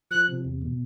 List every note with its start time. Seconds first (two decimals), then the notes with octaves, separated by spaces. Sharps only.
0.11 F3 F#6
0.28 C3
0.45 E2
0.62 B2